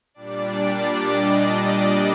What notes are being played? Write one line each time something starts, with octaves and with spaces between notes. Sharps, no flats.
A#2 G3 D4 D5
D#5